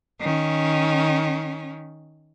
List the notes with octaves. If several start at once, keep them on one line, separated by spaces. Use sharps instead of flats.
D#3 C#4